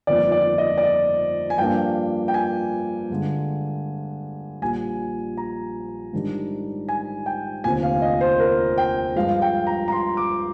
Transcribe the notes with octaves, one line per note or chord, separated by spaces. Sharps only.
G1 F2 D#3 A#3 D5
D5
D#5
D5
D#5
G#5
G2 F3 A#3 D4 G5
G5
G#5
G2 D3 G#3
A#1 A#2 G3 G#5
A#5
G#2 D#3 G3 D4
G#5
G5
F1 D#2 D3 F3 C4 G#5
F5
D#5
C5
A#4
G5
G2 F3 G#3 F5
G5
A#5
A#5
C6
D6